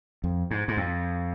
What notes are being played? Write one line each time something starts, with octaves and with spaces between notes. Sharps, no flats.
F2
G#2
G#2
F2